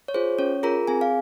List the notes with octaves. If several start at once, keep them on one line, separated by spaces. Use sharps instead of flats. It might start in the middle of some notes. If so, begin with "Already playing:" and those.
C#5
F4 G#4 C5
C#4 C#5
F4 G#4 A#4 A#5
C4 G#4 G#5
F5